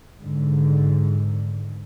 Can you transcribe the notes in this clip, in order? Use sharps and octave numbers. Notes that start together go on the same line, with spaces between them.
G#1 G#2 D3